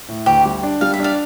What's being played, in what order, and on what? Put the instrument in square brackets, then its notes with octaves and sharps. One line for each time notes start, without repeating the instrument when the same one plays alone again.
[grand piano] A2
[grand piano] D2 [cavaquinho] G4
[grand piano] G3
D4
[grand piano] G3 [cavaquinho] F5
[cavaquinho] E5
[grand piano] D4 [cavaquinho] D5 F5